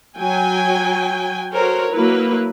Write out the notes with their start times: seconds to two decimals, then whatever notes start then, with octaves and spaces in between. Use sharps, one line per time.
0.18 F#3 G5 G#5
1.53 F#4 A4 A#4 C5 C#5
1.91 F#3 A#3 E4 B4